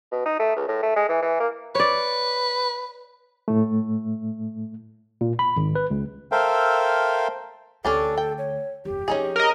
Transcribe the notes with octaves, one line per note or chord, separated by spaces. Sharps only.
B2
D#4
A3
C#2
A2
A3
G#3
E3
E3
A#3
B4 C#5 D5
A2 A3
A#2
B5
G#1
B4
C#2
A4 A#4 C5 E5 F5 G5
D2 C#4 D4 G4 A4
G5
C#5
F#1 E2 G4
F3 C4 C#4 D#4 G#4
A#4 D#5